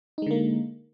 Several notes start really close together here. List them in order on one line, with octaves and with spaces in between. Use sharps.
D#4 G#3 D3 A#3